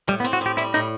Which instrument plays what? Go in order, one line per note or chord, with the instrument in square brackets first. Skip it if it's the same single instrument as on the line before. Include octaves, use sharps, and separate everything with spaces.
[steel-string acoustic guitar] A2 [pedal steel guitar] G3
[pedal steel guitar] B3
[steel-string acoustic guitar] C4
[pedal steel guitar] F#4
[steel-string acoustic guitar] A2 [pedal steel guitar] G4
[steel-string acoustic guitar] G3 [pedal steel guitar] E4
[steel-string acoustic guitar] A2 [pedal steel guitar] D#4